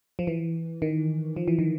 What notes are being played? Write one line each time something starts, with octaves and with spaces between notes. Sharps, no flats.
F3
E3
D#3
F3
E3
D#3